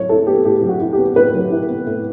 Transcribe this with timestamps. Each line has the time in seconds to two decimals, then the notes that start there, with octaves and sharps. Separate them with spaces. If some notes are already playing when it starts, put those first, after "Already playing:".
Already playing: A2 F#3 C#5
0.09 E4 A4
0.27 B3 G4
0.45 A2 G4
0.63 F#3
0.69 F#4
0.80 E4
0.93 G4
0.98 B3
1.16 A2 B4
1.34 F#3
1.51 E4
1.69 B3
1.86 A2